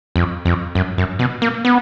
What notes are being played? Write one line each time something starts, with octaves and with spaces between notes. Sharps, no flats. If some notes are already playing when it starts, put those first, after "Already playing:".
F2
F2
F#2
F#2
B2
A#3
B3